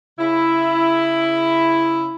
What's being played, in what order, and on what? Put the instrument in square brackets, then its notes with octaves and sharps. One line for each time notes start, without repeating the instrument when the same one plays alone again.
[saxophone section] C#3 E4